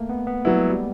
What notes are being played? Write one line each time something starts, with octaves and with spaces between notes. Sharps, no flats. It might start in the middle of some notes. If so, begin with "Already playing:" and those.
Already playing: A3 A#3
B3
B3
F#3 G3 B3 E4
G#3
G3